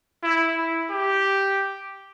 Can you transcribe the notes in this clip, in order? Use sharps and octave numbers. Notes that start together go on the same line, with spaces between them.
E4
E4
G4